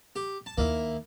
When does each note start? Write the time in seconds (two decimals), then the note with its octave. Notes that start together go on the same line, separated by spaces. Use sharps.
0.16 G4
0.46 A5
0.58 D#2 A#3 E4